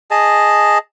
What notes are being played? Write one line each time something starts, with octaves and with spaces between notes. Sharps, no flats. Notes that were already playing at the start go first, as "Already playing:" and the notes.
G#4 D#5 A5